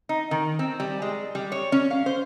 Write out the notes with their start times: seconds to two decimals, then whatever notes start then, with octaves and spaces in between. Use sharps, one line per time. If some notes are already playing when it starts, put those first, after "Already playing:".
0.09 D#4
0.31 D#3
0.59 C4
0.80 G3
1.02 G#3
1.35 G3
1.52 C#5
1.72 C#4
1.91 F5
2.06 C5